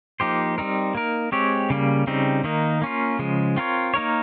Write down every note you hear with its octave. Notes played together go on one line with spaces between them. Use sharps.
F3 A#3 D#4 G4 C5
G3 C4 D#4 A#4
A#3 D#4 A#4
G#3 C4 G4 C#5
C#3 G3 A#3
C#3 G3 C4 D#4
D#3 A#3 D#4
A#3 C#4 F4
C#3 F3 G#3
C4 F4 A#4 C#5
A#3 D#4 A#4 C#5